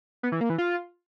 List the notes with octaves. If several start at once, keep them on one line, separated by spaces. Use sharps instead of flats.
B3
E3
A#3
E3
F4